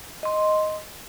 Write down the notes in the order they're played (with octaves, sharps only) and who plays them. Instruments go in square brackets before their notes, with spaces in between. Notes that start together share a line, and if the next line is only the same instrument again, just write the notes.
[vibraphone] D#5 C6